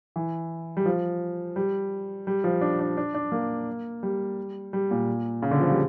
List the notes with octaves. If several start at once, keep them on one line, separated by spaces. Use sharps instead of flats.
E3
G3
F3
G3
G3
F3
D4
D4
D4
D4
A#3
G3
G3
A#2
C#3
D3
F3
G3